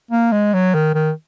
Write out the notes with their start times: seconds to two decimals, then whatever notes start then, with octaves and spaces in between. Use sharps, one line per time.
0.11 A#3
0.32 G#3
0.54 F#3
0.74 D#3
0.94 D#3